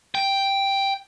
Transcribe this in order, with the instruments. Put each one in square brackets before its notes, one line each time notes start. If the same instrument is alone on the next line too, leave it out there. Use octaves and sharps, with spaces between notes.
[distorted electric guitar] G5